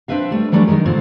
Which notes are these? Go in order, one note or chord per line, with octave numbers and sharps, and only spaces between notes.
C4 D4 B4 E5 F5
G3 A3
E3 F#3 G3 A3 D4
D#3 F#3 G#3 A#4
A#2 D3 C4 F4